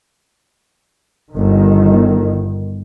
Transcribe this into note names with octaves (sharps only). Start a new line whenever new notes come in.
G1 D#3